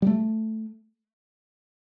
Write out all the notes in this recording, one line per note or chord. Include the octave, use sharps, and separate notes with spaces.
G3
A3